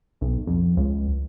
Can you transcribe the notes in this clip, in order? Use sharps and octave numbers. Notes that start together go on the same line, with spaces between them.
B1
F2
C#2